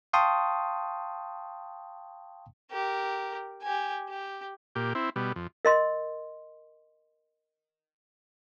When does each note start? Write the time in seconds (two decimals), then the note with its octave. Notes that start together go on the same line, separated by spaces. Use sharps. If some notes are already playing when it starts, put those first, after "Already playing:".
0.13 F5 G5 A5 C6 C#6 D#6
2.71 G4 A#4
3.62 G4 G#5
4.09 G4
4.76 A#2 G4
4.95 C4 E4
5.16 B2 G3
5.36 F2
5.65 A#4 D#5 C6